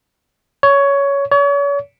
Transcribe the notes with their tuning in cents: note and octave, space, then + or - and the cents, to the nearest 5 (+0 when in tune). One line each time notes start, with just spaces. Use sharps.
C#5 +15
C#5 +40